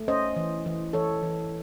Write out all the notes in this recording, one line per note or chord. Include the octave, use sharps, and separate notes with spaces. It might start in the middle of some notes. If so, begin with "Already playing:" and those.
Already playing: A3
C#4 C5 D#5
E3
E3
E3 A4 C#5
E3